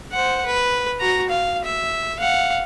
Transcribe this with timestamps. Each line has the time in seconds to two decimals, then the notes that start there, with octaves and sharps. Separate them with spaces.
0.12 C5 F#5
0.46 B4
1.00 F#4 A#5
1.29 F5
1.65 E5
2.19 F5 F#5